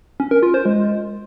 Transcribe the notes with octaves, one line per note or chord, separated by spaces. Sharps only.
C#4
A#4
F4
C5
G#3